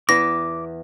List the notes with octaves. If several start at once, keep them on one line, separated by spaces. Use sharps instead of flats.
E2 B3 E4 D6 A#6